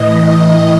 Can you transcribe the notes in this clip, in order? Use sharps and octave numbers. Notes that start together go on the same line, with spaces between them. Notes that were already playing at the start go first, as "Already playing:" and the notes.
Already playing: A2 E3 D#5